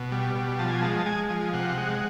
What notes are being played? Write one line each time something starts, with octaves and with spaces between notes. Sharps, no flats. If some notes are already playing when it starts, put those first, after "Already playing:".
Already playing: B2
G3
B2
F3 A5
G#5
G#3 A5
A5
G#3 G#5
F3
C3 F#5
G#3